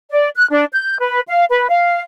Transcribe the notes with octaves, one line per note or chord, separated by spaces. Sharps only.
D5
F#6
D4
G6
B4
F5
B4
F5